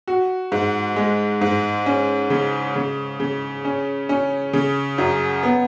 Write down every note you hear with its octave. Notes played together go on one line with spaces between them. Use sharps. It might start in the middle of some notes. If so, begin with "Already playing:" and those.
F#4
G#2
G#3
G#2
C#4
C#3
C#3
C#3
C#4
C#4
C#3
F#2
B3